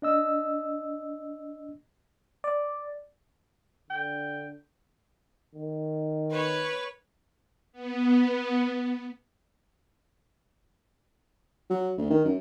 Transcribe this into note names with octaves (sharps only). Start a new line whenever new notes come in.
D4 D#5 E6
D5
D3 G5
D#3
B4 C#5
B3
F#3
D2
D#3
F#2